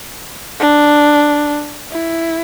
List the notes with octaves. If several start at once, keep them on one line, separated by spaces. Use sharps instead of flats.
D4
E4